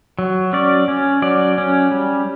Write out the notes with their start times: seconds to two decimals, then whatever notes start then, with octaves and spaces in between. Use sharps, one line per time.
0.19 F#3
0.53 C#4 D5
0.88 C#4
1.22 F#3 D5
1.58 C#4
1.91 G3